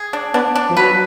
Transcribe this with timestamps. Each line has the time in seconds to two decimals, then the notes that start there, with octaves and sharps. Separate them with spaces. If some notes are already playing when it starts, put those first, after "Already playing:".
Already playing: G#4
0.13 D4
0.34 B3 D4
0.55 D4
0.71 F3
0.77 F#3 B4